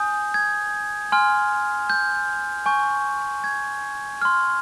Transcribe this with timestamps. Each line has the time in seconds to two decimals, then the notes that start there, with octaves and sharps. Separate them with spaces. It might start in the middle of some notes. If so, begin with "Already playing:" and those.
Already playing: G#5 D#6 G6
0.34 G#6
1.12 G#5 C6 F6
1.90 G6
2.66 G#5 C#6 G6
3.44 G#6
4.22 C6 F6